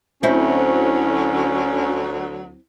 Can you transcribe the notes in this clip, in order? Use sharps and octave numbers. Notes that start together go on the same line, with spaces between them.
D2 D3 F#3 C4 C#4 E4